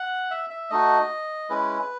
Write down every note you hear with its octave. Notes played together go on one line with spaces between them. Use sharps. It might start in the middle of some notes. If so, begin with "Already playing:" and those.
Already playing: F#5
E5
E5
A3 D#4 F#4 D#5
G#3 C#4 E4 B4